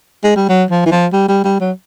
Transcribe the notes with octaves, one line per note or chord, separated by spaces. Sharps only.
G#3
G3
F#3
F3
E3
F3
G3
G3
G3
F#3